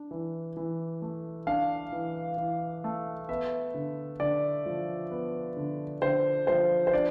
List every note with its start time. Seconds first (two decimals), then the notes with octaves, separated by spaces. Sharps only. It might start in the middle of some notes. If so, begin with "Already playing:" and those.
Already playing: D4
0.11 E3
0.57 E3
1.02 A3
1.47 D4 F5
1.92 E3
2.37 E3
2.84 A3
3.29 B3 E5
3.74 D3
4.20 D3 D5
4.66 F3
5.11 B3
5.57 D3
6.02 D3 C5
6.47 F3 C5
6.87 C5
6.93 D4 D5